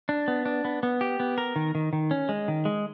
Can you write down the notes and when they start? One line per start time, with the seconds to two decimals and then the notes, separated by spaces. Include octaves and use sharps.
0.09 D4
0.28 B3
0.46 D4
0.65 B3
0.83 B3
1.01 G4
1.20 B3
1.38 A#4
1.56 D#3
1.75 D#3
1.93 D#3
2.11 C#4
2.29 G#3
2.48 D#3
2.65 G#3